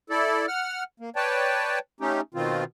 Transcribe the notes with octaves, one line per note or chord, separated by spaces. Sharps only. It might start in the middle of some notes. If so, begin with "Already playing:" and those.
E4 A4 D5
F#5 F6
A#3
B4 C#5 D5 G5 A5
A3 C#4 D#4 G4
B2 D#3 C4 F4